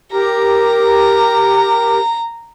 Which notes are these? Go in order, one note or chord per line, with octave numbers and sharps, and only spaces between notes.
G4 A#4 A#5